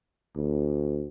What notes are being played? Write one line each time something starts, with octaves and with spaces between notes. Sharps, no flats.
D2